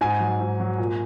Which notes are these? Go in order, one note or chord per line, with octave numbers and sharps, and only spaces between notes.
G#2 G#5
F#3
G#2
F#3
A#2